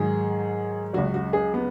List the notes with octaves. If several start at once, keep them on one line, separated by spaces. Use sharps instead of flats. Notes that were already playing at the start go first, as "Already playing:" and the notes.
Already playing: G#2 D#3 F#3 G#4
C#2 C#3 F#3 F#4
F#4
G#4
B3